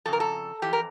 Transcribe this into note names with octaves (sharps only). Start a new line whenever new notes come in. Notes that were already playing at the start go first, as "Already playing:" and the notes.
F2 C#3 A4
A#4
A4
F2 E3 G4
A#4